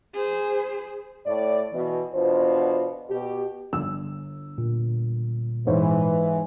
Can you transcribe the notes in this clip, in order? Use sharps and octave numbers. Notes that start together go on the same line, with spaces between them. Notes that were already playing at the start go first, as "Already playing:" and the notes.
G#4 C5
A2 D5
B2 E3
E2 B2 D4 F4 C5
B2 G4
G1 E6
A#2
G#2 E3 C5 C#5